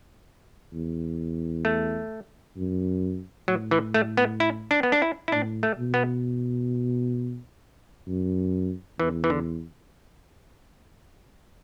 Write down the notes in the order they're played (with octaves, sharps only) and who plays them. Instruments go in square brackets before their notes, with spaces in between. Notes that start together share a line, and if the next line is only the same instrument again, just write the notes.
[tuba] E2
[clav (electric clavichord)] A3
[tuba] F#2
[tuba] A2 [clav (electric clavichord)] F#3
[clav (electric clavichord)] E3
A3
B3
E4
D4
B3
D4
E4
E4
[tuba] A2 [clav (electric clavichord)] D4
[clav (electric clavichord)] A3
[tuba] B2
[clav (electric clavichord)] B3
[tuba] F#2
[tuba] E2 [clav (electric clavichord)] E3
[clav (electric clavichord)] E3
D3